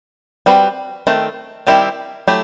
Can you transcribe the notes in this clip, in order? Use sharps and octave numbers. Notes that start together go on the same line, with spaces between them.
G3 C4 F#4 B4
D#3 A3 C4
D#3 G3 C4 E4 G4
F#3 A3 E4 G4